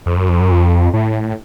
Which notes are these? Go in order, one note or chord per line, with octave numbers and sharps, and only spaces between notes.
F2
F#2
F2
F#2
F2
A2